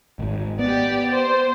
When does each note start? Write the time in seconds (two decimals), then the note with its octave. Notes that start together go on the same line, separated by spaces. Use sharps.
0.19 G#1 G#2
0.59 B3 G4 D5
1.11 C5